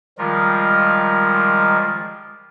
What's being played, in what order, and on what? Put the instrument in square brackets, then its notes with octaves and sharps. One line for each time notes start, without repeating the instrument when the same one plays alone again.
[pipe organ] D#3 F3 G3 G#3 F4 A#4